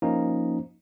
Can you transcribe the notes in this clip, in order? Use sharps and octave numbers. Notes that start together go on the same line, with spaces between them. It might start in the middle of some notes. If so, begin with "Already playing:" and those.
F3 A#3 C#4 D#4